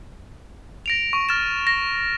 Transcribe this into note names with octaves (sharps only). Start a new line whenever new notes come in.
A#6 D7 F7
C#6
F6 A6 E7
A#6